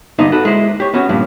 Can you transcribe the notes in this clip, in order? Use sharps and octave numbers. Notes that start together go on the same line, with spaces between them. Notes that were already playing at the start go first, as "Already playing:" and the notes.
G2 D3 B3 D#4 C5 D#5
F#4 A4 B4
G#3 E4 C5
G4 C#5
B3 C#4 F#4 C#5
G2 A#2 F3